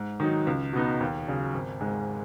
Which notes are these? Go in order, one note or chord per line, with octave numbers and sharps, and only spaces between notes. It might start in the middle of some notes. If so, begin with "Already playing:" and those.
Already playing: G#2
D#3 F#3 D#4
C#2
B2 B3 D#4
D#2
C#3 F#3
G#1
G#2 G#3